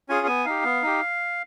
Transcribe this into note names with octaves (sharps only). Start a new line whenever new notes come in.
C#4 F4 G#4 G#5
B3 G#5
D#4 G4 F5
B3
D#4 G4